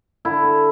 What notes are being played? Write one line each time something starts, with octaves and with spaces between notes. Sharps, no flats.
D3 E4
E4